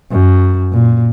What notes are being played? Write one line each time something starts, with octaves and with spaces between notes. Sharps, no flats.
F#2
A#2